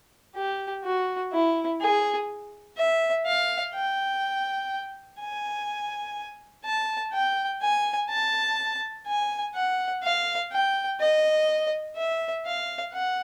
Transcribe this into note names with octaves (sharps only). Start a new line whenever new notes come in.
G4
F#4
E4
G#4
E5
F5
G5
G#5
A5
G5
G#5
A5
G#5
F#5
F5
G5
D#5
E5
F5
F#5